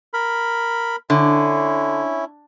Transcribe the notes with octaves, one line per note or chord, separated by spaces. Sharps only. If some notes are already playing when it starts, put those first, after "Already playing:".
A#4 B5
D3 C#4 E4